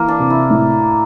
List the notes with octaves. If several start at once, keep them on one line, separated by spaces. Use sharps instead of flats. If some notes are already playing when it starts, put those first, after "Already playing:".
Already playing: E3 A#3
D4
C3
E4
A2